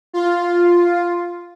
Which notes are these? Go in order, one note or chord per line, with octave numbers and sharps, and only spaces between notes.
F4